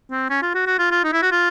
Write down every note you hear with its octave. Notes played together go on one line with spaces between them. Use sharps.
C4
C#4
F4
F#4
F#4
F4
F4
D#4
E4
F#4
F4